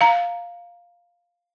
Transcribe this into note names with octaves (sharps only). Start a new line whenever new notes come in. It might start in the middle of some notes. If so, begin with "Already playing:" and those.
F5 A#5